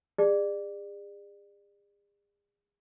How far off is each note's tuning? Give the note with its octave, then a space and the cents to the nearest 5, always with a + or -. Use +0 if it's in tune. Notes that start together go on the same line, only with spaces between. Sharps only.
G#4 -40 D5 +25